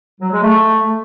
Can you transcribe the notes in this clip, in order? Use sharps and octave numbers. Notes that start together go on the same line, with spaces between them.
F#3
G#3
A3